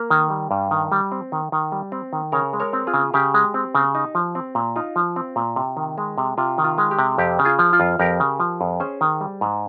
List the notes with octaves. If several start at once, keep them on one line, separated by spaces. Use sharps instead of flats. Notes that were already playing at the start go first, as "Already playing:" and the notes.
Already playing: A#3
D#3
G3
G2
D#3
G3
C4
D#3
D#3
G3
C4
D#3
C#3 A#4 C#5
G#3
A#4 C#5
C4
F4 G#4
C#3
C#3 G4
G#3
C4
C#3
D#4
F3
C4
A#2
D#4 F4
F3
C4
A#2
C3
D#3
G#3
C3
C3 F4
D#3
F4
G#3
G4
C3
F2 G4
C#3
F4 G#4
F3
F4
F2
F2 G4 A#4
C#3
F3
F2
C#4 G#4 C5
D#3
G3
G#2